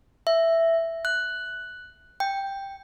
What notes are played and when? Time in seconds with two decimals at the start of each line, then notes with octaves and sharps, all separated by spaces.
0.27 E5
1.05 F#6
2.20 G5